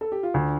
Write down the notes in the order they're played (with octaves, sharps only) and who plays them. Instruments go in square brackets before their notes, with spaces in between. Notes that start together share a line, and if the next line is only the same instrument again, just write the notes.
[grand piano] A4
G4
F4
[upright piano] D2 [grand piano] D4